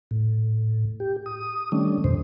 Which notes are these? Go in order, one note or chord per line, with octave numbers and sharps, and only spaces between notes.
A2
G4
D#6
D#3 G3 A3 C#4 D4
F2 B2 C5